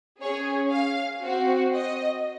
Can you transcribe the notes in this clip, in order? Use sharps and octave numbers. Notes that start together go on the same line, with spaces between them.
C#4 G#4 C#5
F5
C4 F#4
D#5